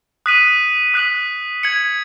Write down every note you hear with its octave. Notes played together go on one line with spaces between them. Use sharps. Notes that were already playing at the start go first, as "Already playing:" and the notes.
D#6 F#6 B6 D#7 F#7
D#6 F#6 B6 D#7 F#7
G#6 C#7 F#7